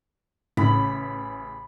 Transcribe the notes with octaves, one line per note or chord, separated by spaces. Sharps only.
A1 A2 C#3 B5 B6